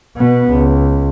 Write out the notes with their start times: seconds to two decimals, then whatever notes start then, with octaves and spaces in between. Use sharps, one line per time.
0.17 B2 B3
0.50 C#2